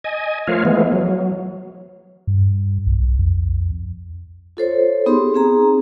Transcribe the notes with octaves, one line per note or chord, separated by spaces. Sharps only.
D#5 G#5
F3 A3 F4 A#4 C#5 F5
E3 F3 G#3 A3 B3
F#3
G2
B1
F2
F4 A4 C5 C#5
B3 D#4 G4 G#4 C6
C4 G#4 A#5